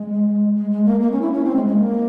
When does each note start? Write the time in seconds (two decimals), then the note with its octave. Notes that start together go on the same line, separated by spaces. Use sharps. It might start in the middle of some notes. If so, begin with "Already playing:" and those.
Already playing: G#3
0.56 G#3
0.71 G#3
0.85 A#3
1.00 A#3
1.12 C#4
1.21 E4
1.33 C#4
1.45 C4
1.55 G#3
1.66 G#3
1.77 A#3